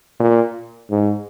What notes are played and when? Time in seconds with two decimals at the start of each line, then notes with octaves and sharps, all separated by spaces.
0.20 A#2
0.91 G#2